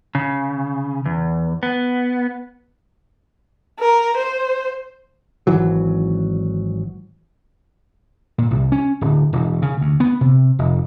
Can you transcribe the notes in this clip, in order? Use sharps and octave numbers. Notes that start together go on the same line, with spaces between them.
C#3
E2
B3
A#4
C5
G#1 E3 F#3
A#2
C2
C#4
D1
E1
C#3
D2
B3
C3
F1